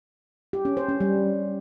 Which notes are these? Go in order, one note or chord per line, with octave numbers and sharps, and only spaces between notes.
G4
C#4
C5
C#4
G3